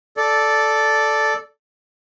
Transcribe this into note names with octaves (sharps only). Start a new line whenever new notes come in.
A4 D5